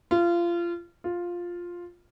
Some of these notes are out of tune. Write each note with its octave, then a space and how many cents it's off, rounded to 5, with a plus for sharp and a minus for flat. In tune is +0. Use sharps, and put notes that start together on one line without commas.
F4 -25
F4 +5